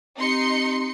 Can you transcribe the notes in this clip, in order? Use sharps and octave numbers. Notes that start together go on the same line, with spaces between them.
C4 D#4 G4 C6 C#7